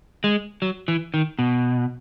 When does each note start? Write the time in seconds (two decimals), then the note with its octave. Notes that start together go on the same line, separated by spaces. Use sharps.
0.24 G#3
0.62 F#3
0.88 E3
1.14 D#3
1.39 B2